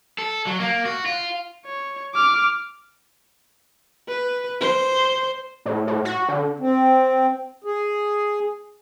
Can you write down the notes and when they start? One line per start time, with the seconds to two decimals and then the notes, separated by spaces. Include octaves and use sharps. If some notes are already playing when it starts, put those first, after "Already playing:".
0.18 A4
0.47 F#3
0.60 A#3
0.85 F#4
1.06 F4
1.65 C#5
2.15 D6 F6
4.08 B4
4.61 C5
5.66 A2
5.87 A2
6.05 F#4
6.29 D3
6.60 C4
7.64 G#4